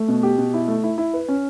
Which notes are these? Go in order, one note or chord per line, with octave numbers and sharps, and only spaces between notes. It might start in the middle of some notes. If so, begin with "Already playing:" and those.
Already playing: A3
B2
G4
B2
E4
A3
E4
E4
B4
C#4